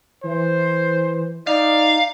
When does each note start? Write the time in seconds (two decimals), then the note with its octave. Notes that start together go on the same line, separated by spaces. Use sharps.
0.24 E3 C5
1.47 D#4 D5 F5